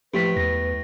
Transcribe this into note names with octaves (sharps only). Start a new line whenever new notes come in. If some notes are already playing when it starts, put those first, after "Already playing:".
A2 F3 G4 B4 B6
E2 A#6